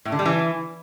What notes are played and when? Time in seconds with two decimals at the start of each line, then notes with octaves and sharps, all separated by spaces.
0.05 A2
0.12 D3
0.19 G3
0.26 E3